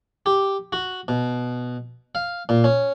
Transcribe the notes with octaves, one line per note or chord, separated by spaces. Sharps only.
G4
F#4
B2
F5
A#2
C#4